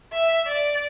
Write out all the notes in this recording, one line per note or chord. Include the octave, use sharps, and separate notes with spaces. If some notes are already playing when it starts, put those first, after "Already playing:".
E5
D5